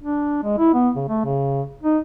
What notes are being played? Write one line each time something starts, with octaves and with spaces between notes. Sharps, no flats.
D4
G#3
E4
B3
C#3
A3
C#3
D#4